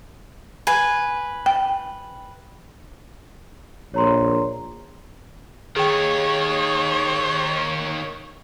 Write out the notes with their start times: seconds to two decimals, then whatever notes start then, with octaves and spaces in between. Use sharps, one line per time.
0.67 B4 G#5
1.46 G5
3.94 A#1 C#5 A#5 C6
5.76 D#2 D#3 G#4 C#5 G5